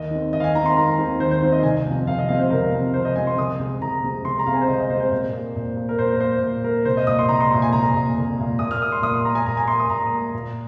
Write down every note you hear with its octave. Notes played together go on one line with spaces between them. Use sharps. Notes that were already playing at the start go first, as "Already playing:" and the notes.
Already playing: D#2 D#5
D#3 C4
D#2 D#5
F5
G#5
D#3 C4 A#5
C6
D#2 A#5
D#3 C4
D#2 C5
C5
D#3 C4 C5
D#5
C2 G#5
C3 F3 C4
C2 F5
D#5
C3 F3 C4 F5
C5
C2 A#4
C3 F3 C4
C2 C5
D#5
C3 F3 C4 G#5
C6
C2 D#6
C3 G#3 C4
C2 A#5
C3 G#3 C4
C2 C6
A#5
C3 G#3 C4 F5
G#5
C5
C2 D#5
D#5
C3 G#3 C4 C5
C5
A#2
A#3
A#2
A#3
A#4
A#2 C5
A#4
A#3 C5
A#2
A#3 A#4
C2 C5
D#5
A#2 A#3 D#6
C6
C2 A#5
C6
A#2 A#3 C6
G#5
C2 A#5
A#2 A#3
C2
A#2 A#3
A#2 D#6
F6
A#3 D#6
C6
A#2 D#6
C6
A#3 A#5
G#5
A#2 A#5
G#5
A#3 C6
D#6
A#2 A#5
A#3
A#2